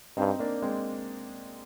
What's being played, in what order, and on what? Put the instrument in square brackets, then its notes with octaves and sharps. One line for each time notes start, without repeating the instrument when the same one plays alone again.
[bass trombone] G2 [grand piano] C4 D#4
[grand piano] A#3 D4
G#3 C4